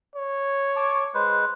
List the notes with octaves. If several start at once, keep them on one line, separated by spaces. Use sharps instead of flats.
C#5
A5 C#6 D6
G#3 B4 C5